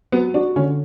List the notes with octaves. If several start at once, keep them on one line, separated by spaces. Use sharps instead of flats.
F#3 B3
D4 F#4
D3 C#4